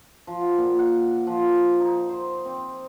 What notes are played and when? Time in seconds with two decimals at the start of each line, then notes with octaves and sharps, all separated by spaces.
0.27 F3
0.42 F#5
0.58 A#2
0.79 F#5
1.27 F3
1.80 D#4
2.09 C5
2.46 C4